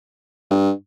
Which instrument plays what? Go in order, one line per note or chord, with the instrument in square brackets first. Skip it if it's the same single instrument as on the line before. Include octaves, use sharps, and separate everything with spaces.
[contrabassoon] G2